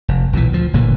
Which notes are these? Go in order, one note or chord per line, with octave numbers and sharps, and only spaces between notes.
F1
B1 A#2 D3 E3
D2 F3
F#1 A#2 D3 E3